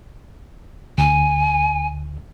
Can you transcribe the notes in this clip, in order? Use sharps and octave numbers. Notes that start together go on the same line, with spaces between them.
D2 G#5